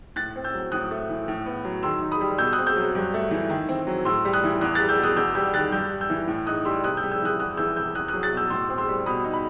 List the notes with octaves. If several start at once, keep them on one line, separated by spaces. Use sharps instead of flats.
A2 F#6 A6
C4
E6 G6
F#3
A2 D#6 F#6
A3
E3
A2
B3
F#3
D#3 C6 E6
D#4
B5 D#6
G3
B2 E6 G6
D#6 F#6
C4
E6 G6
F#3
G2
A3
E3
D#3
C4
F#3
A2 C6 E6
G3
D#6 F#6
E3
E2 D#6 F#6
G3 F#6 A6
E6 G6
B2
D#6 F#6
E2 E6 G6
G3 E6 G6
D#3 F#6 A6
G2 E6 G6
G3
E6 G6
E3
A2
D#4 D#6 F#6
G3 C6 E6
C3 D#6 F#6
E6 G6
G3
E6 G6
E3 D#6 F#6
E2 D#6 F#6
E3 E6 G6
C3 E6 G6
E2 D#6 F#6
F#3 D#6 F#6
F#6 A6
B2
E6 G6
A2 C6 E6
C4
C6 E6
G3
B2 B5 D#6
D#4
B5